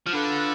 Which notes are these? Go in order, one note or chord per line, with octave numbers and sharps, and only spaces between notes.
F3
D3 F4 B4 F#5